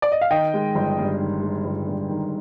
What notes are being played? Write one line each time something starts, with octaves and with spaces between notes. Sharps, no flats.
D5
D#5
F5
D#3 D#5 G5
G#3
G1
G2
D#3
G#3
G1
G2
D#3